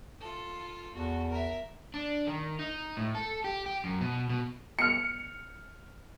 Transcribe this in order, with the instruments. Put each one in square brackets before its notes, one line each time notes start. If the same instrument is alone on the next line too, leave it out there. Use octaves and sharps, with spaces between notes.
[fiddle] F4 A4
[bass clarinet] E2 [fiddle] F#4 A4
[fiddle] A#4 E5
[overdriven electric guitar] D4
D#3
D#4
A2
A4
G4
G4
F#2
B2
B2
[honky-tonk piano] F6 C#7